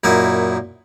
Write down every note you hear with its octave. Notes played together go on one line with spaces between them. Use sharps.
F#2 A#2 D#4 E4 F#5